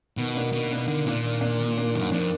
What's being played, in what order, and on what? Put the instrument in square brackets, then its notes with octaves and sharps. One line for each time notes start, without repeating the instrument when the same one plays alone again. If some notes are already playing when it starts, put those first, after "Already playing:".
[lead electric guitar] B2 [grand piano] D#3
[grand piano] A#3 D4
[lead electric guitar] B2 [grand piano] D#3
[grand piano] A#3 D4
[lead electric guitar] D3 [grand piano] D#3
[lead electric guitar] A#2 [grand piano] A#3 D4
[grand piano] D#3
A#3 D4
D#3
A#3 D4
[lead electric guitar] F#2 [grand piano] D#3
[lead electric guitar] F2 [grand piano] A#3 D4